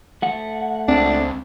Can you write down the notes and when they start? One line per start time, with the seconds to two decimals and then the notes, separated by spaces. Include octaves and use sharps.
0.22 A3 F#5
0.88 C#2 C4 D4